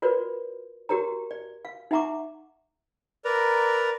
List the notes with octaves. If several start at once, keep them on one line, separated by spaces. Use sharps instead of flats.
F4 F#4 A#4 B4 C#5 D5
F#4 G4 A#4 C#5 A#5
D5
F5
D#4 E5 F#5 A#5 C#6 D6
A#4 B4 D5 A#5